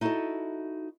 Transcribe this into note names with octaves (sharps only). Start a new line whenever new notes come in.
D#4 E4 F#4 G4 A4 D#5